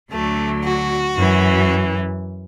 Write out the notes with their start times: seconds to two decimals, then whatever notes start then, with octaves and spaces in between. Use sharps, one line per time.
0.12 D2 D3 F#3 A3
0.64 F#4
1.16 F#2 E3